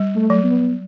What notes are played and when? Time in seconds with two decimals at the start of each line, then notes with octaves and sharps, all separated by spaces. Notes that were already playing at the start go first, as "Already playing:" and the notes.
Already playing: G3
0.15 A3
0.30 F#3
0.44 B3